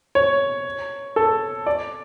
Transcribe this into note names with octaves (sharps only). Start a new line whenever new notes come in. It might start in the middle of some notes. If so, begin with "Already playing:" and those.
C#5
A4
D5